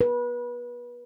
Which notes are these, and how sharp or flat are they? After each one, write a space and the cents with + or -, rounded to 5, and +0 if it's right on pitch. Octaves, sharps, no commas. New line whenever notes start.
B4 -30